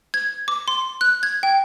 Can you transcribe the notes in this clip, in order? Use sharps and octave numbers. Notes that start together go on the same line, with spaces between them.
G#6
D6
C6
F#6
G#6
G5